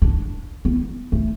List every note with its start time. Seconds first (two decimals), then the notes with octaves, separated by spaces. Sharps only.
0.02 D4
0.65 B3
1.12 A3